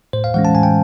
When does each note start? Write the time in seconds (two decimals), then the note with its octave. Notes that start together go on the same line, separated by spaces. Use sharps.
0.13 A2 C5
0.24 F5
0.34 E3 G#3 C#4 F#5
0.45 A5
0.55 A2 G#5
0.63 G5